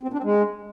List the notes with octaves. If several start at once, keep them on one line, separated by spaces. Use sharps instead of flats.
C4
A#2
D4
C4
G#3